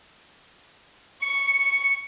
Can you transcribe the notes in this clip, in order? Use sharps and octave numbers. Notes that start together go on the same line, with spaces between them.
C#6 C#7